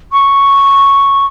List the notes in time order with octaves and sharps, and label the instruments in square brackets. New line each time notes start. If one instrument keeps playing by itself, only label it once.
[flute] C#6